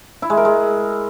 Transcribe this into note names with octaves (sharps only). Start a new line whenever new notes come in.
E4
G#3
A#4
G#3